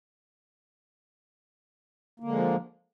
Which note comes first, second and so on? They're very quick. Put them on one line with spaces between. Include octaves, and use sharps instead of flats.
A#3 D3 G#3 F3